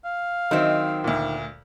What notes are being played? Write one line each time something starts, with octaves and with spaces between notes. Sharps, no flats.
F5
D#3 F#3 C4 C5 E5
D2 A#2